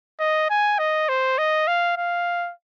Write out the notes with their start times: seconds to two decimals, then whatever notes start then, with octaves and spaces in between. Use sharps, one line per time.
0.20 D#5
0.50 G#5
0.79 D#5
1.09 C5
1.38 D#5
1.68 F5
1.97 F5